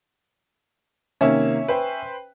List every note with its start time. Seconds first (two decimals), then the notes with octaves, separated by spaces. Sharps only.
1.21 C3 D#3 A#3 C#4 E5
1.68 B4 C5 G5